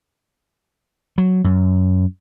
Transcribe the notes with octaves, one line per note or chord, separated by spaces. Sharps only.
F#3
F#2